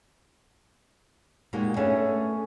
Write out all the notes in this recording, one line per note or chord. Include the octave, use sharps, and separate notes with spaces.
A#2 G#3 A#3 D#4 F#4 G4
A3 B3 C#4 D4 G#4 A4